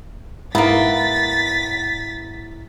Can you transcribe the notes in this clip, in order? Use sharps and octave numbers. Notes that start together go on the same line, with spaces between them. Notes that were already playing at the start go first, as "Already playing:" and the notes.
G#2 A#3 B3 E4 A#5 A6 B6